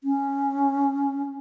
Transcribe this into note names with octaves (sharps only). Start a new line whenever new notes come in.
C#4